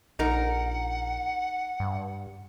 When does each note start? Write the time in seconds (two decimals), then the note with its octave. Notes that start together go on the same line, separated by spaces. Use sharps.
0.19 A#1 D#4 A#4 F#5
1.80 G2